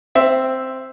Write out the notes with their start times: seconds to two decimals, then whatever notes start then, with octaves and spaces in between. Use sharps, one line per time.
0.15 C4 E5